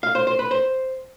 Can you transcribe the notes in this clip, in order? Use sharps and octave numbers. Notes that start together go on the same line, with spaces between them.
F5
C5
C5
B4
C5